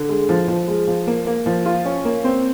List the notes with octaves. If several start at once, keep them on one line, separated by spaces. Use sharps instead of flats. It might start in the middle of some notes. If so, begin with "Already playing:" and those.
Already playing: D3
G#3
F3
F3
G#3
F3
A#3
A#3
F3
F4
C#4
A#3
C4